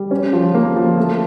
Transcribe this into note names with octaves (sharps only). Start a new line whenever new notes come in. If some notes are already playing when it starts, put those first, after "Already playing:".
Already playing: G3
C#4
F3
A#3
F3
A3